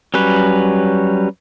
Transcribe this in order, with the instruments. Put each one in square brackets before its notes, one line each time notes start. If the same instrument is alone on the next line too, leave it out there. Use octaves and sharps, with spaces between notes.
[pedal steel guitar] F#3 G3 C#4 B4